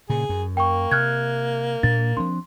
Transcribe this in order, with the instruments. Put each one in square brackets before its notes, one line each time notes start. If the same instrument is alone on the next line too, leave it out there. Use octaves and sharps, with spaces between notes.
[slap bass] A#2 C#3 [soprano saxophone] G#4
[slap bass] F#2
[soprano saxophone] A#3 [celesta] G5 C#6
[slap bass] C3 [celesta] F6 F#6 G#6
[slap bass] A#2 D4 [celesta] A6
[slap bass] F3 C4 D4 [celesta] C6